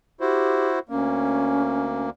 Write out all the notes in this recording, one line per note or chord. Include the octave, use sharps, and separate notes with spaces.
E4 F#4 G4 C5
D2 A#3 C#4